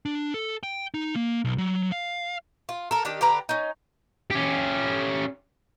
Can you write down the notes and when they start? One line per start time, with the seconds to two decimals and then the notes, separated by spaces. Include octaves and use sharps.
0.05 D4
0.34 A4
0.63 G5
0.94 D#4
1.16 A#3
1.45 B1
1.58 F#3
1.92 F5
2.69 F4
2.91 A4 A#4
3.05 D#3 D4 G4
3.21 D3 G4 B4 A#5
3.49 C#4 D#4
4.31 C#4 G4